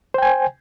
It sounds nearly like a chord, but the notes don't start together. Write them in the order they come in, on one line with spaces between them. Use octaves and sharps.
C5 G5 G#5